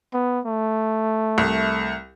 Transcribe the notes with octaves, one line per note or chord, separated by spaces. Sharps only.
B3
A3
C2